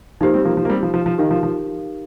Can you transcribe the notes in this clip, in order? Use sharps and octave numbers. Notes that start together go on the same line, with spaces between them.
F3 A#3 D#4 G4 C5
G3 C4
F3 A#3
F3
A#3
G3 C4
F3
F3
F3
D#3 D#4 G4 A#4 F5
F3
F3